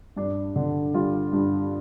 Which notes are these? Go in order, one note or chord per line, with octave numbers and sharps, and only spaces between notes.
G2 D4
D3
G3 F4
G2